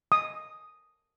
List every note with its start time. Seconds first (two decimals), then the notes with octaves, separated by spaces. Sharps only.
0.12 D#6